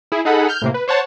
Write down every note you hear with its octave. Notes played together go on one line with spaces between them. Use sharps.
E4 G#4
D#4 G#4 A4 F#5 B5
F6 G6
A2 C3 A#3
B4
C5 C#5 F#5 A5